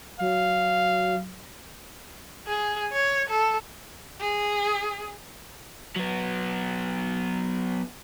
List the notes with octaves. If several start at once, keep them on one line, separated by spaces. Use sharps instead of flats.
F#3 F5
G#4
C#5
A4
G#4
F#3 B3